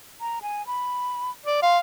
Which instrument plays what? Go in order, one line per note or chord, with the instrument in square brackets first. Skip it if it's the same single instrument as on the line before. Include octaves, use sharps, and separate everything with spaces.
[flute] A#5
G#5
B5
[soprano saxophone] D5
[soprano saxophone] F5 [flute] C6